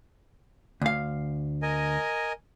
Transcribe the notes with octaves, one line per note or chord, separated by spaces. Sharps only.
D2 F5
A#4 D#5 G#5